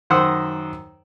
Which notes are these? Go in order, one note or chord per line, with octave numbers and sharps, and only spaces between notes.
F#2 D#3 C5 F#5 D#6 E6